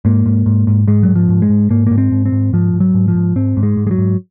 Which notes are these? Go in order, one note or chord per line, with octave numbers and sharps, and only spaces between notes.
G#2 A#3
G#2
G#2
G#2
G#2 G#3
F#3
G#2
F3
G#2
G#3
G#2
G#2 A#3
G#2 A#3
C4
G#2
C4
G#2
G#2 F3
G#2
F#3
G#2
F3
G#2
G#2 C4
G#2
G#3
G#2
G#3
F#3
G#2